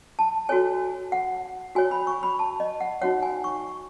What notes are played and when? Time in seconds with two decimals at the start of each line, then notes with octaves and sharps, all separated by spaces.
0.19 A5
0.49 F#4 A4 C#5 G#5
1.12 F#5
1.75 F#4 C#5 G#5
1.91 B5
2.07 C#6
2.23 B5
2.39 A5
2.60 D#5
2.80 F#5
3.02 D#4 F#4 C#5 F#5
3.23 G#5
3.44 C#6